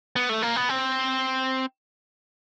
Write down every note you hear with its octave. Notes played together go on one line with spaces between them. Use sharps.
B3
A3
A#3
B3
C4